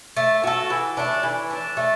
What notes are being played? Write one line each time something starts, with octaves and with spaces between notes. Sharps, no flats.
A3
F#4 A4
E3
A3 D4
E3
A3 D4
A3